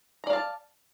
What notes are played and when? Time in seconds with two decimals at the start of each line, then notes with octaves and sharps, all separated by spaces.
0.24 A#5
0.27 D5
0.30 F5
0.33 A5